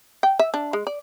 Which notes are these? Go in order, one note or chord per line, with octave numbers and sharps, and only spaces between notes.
G5
E5
D4
G#3
D5